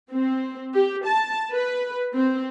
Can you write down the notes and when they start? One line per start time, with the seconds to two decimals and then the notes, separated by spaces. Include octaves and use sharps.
0.12 C4
0.74 G4
1.06 A5
1.53 B4
2.16 C4